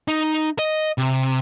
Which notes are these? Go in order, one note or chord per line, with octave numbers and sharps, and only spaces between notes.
D#4
D#5
C3